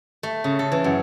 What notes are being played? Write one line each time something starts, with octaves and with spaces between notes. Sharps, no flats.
A3
C#3
A4
E3
F#2